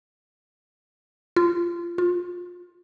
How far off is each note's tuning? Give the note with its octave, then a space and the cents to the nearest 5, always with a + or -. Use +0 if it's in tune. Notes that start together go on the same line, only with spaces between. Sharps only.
F4 -25
F4 +20